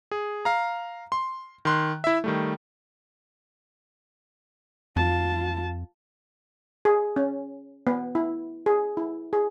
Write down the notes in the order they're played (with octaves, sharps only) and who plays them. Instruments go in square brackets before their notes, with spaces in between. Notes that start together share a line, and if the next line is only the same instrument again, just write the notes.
[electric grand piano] G#4
F5 A#5
C6
D#3 C6 F#6
E4 E5
D#3 G3 A3
[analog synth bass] F2 [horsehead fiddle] F4 A5
[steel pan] G#4
C#4
B3
E4
G#4
E4
G#4